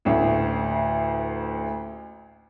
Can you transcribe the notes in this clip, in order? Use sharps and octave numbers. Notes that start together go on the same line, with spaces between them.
A1 D2